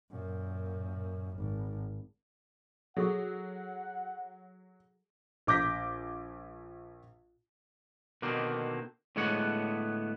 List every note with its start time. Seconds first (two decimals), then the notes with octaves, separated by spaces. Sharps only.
0.11 F#2 A#2
1.37 G#1
2.97 F#3 G#4 A4 F#5 C#6
5.47 A#1 D6 G6 A#6 B6
8.22 B2 D3 D#3 A#3 C4
9.16 A2 D3 G#3 B3 C#5 F#5